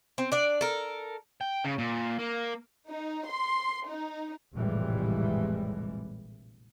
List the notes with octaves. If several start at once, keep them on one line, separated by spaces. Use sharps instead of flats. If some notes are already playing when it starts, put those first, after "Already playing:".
C4
D4 D5
A4 A#4
G5
C#3
A#2
A#3
D#4
C6
D#4
F1 A#1 A2 E3 G3 G#3